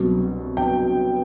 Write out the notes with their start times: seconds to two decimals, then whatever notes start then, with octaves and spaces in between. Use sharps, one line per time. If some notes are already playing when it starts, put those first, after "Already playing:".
Already playing: C2 B2 F#3
0.57 G5